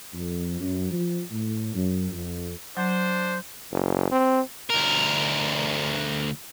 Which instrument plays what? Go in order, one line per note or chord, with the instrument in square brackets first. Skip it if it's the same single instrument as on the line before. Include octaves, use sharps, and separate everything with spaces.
[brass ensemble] F2
F#2
F3
A2
F#2
F2
[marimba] F#3 [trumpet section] D4 C5
[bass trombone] F#1
C4
[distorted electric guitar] D2 A#4